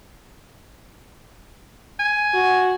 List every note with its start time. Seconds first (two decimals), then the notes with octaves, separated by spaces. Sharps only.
1.99 G#5
2.34 F#4